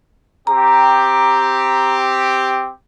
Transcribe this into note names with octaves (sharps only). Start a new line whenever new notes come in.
C4 G4 A#5